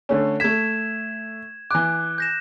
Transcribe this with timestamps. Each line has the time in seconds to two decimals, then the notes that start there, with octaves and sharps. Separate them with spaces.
0.09 D3 A3 C#4
0.40 A3 G#6 B6 E7
1.71 E3 D6 F#6
2.18 G6 A#6 E7